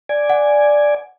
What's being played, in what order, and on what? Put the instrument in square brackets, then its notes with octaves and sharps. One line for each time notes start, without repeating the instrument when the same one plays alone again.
[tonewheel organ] D5 G#5
[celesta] F#5